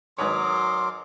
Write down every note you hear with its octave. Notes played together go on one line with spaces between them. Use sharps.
G#1 F#3 A#4 B4 C#5 C6 D6 D#6